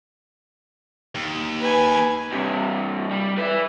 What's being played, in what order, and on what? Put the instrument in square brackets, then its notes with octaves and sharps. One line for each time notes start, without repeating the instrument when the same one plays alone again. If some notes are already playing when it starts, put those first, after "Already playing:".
[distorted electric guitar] D#2
[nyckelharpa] B4 G#5
[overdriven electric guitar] G2 C3
G3
B4 E5